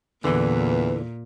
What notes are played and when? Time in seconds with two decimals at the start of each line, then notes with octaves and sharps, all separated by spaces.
0.24 E2 A#2 D3 E3 B4